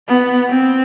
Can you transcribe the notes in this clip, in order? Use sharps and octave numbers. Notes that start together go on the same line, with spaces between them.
B3
C4